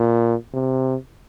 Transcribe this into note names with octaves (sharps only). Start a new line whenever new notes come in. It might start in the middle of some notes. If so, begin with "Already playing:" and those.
Already playing: A#2
C3